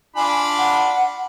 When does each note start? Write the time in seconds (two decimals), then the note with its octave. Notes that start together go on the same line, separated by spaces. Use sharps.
0.16 D4 F4 G#5 B5
0.58 F#5